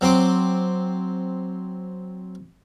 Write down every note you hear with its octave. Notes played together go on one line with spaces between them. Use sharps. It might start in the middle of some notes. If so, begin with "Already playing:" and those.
F#3 C4 C6 D6